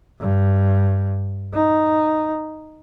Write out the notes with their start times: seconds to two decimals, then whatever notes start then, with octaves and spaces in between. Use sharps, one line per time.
0.20 G2
1.53 D#4